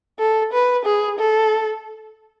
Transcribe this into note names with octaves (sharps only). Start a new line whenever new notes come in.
A4
B4
G#4
A4